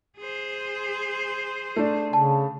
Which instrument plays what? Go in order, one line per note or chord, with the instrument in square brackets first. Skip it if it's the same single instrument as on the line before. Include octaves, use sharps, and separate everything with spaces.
[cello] G#4 C5
[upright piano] A3 D4
[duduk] C#3 [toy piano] A5